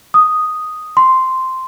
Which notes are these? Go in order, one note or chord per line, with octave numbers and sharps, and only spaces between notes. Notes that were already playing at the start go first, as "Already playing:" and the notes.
D#6
C6